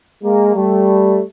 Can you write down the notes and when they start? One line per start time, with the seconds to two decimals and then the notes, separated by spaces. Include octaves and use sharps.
0.23 G#3 A#3
0.55 G3 A3